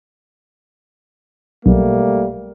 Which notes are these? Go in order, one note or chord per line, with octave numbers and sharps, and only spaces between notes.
B1 G3 A3 A#3